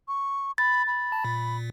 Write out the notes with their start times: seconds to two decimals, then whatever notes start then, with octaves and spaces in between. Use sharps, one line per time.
0.08 C#6
0.58 B5 A6
0.87 B5
1.12 A5
1.25 A#2